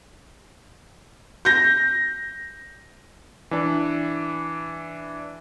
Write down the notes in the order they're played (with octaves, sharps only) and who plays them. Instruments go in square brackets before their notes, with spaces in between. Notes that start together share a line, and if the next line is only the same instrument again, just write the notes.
[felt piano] G6 A#6
[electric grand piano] E3 D4